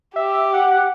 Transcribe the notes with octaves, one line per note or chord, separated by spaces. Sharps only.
G4 E5
F#5